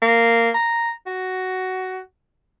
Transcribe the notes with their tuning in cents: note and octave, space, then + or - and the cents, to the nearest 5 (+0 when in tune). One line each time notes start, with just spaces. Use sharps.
A#3 -15
A#5 -5
F#4 +10